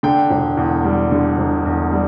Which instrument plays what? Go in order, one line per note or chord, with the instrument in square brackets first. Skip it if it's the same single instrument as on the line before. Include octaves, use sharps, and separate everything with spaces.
[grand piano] D3 G5
E1
E2
G3
D3
E1
E2
G3